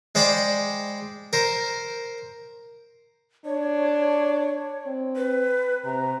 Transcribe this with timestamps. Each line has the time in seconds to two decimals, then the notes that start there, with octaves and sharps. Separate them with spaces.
0.15 G#3 C5 D5 G5 B5
1.33 A#4 C5
3.46 D4 C#5
4.86 C4
5.16 B4
5.85 C3 A#5